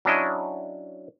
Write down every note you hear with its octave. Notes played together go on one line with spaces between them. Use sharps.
F#3 C#4 D4 E4 D#5 G#5